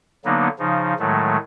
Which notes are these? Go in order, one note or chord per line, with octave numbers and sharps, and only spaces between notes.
D3 F#3 A#3 B3 D#4
C#3 F3 D#4
A2 D#3 F#3 G#3 A3